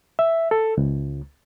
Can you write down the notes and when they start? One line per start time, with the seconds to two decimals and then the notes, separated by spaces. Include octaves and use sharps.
0.19 E5
0.51 A4
0.77 C#2